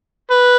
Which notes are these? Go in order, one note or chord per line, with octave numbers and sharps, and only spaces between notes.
B4